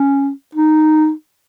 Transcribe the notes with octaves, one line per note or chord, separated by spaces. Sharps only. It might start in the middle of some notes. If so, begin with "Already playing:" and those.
Already playing: C#4
D#4